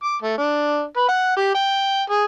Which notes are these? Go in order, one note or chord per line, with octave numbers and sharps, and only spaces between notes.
D6
A3
D4
B4
F#5
G4
G5
G#4